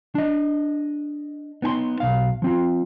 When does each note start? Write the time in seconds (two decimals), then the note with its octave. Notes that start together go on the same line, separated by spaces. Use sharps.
0.15 D4 D#5
1.62 B3 D#4 G#5 C6
2.00 B1 F5
2.42 F3 C4 F4